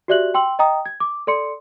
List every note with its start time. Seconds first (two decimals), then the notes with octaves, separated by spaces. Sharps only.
0.08 F#4 G4 D5 E5 F#6 F#7
0.34 G5 C6 E6 F#7
0.59 D#5 G5 A#5 D#6
0.86 G#6
1.00 D6
1.27 A4 D5 C6 C#7